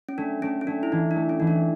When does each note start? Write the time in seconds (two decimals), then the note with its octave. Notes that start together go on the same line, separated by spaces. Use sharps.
0.09 C#4
0.18 A3 D4
0.42 A3 C#4
0.61 C#4
0.67 A3 D4
0.83 E4
0.92 E3 D#4
1.11 D4
1.16 A3
1.29 C#4
1.40 E3 D#4
1.47 D4